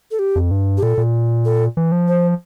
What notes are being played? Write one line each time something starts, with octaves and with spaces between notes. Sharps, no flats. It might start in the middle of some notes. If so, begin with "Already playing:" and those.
A4
G4
F2
G2
G4
A#2 A4
A#2
A4
E3
F3
C5